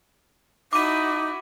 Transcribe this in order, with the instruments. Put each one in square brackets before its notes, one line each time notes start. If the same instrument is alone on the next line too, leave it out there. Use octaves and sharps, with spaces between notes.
[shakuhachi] D#4 [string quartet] E4 F#4 [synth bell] D6 D#7